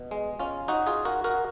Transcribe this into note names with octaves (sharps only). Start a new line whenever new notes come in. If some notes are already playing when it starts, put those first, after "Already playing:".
Already playing: B2
G#3
C#4 F4
D#4 F#4
F4 G#4
F#4 A#4
F#4 A#4